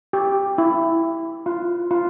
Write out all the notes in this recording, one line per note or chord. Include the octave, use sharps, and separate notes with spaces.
G4
E4
F4
F4